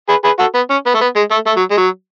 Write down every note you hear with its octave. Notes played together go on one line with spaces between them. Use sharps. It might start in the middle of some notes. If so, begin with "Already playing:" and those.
G#4 B4
G#4 B4
F#4 A4
B3
C#4
B3
A3
B3
G#3
A3
A3
F#3
G#3
F#3